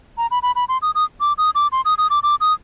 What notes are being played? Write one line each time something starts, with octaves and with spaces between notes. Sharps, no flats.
A#5
B5
B5
B5
C6
D#6
D#6
D6
D#6
D6
C6
D#6
D#6
D6
D6
D#6